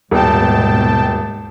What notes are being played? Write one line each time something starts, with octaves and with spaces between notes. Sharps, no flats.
D#1 G#2 B2 G5 A5